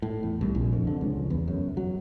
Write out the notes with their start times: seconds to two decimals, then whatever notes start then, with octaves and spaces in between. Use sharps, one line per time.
0.02 A2
0.23 E2
0.41 C2
0.55 A#1
0.73 F2
0.87 D3
1.01 C#2
1.30 E2
1.48 F#2
1.77 F#3